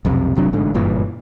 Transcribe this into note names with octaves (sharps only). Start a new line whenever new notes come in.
B1 F2 C3
D#1 C3 F#3 D4
A1 G#2 D3
F#1 G2 A#2 E3